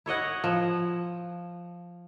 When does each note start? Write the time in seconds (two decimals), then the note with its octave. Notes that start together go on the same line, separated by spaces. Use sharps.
0.06 E4 C#5 D#5 F#5
0.44 F3